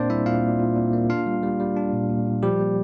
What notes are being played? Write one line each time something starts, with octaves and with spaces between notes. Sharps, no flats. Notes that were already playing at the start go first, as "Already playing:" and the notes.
Already playing: A#2 A#3 C4 D4 C5 D5
G3 E4 E5
A#2 F4 F5
A#2
A#2
A#2
A#3
D4 F4 F5
G3
G3
G3
D4
A#2
A#2
A#2
F3 G3 G4
A#3